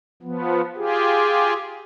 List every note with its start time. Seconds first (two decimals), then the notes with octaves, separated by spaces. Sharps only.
0.22 F3 B3
0.76 F4 G4 G#4